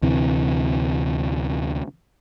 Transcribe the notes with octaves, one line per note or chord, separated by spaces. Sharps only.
D2 C3 E3